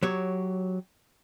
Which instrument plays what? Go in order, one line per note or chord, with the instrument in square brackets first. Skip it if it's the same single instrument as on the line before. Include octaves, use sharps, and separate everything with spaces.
[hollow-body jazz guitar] F#3 G4 C#5